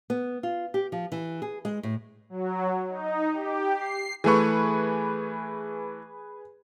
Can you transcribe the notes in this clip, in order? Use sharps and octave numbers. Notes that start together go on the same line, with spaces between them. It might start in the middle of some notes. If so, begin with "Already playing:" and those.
B3
F4
G4
F3
E3
G#4
G#3
A2
F#3
D#4
G4
C7
E3 A3 G#4 B4 C#6